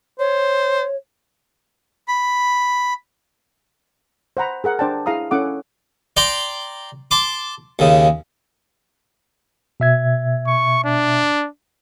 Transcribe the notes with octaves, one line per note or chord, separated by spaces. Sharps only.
C5 C#5
B5
C5 F#5 A#5 B5
G#4 A#4 F#5
D4 C5 D5 G5 A5
E4 G#4 F5 A#5 D#6
C#4 E4 A4 F#5 D6 D#6
D5 G5 A#5 C6
A5 C6 D6
D#2 C#3
B2 E5 G#6
C#6
D4